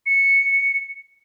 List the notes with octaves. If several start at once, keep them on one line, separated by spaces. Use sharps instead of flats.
C#7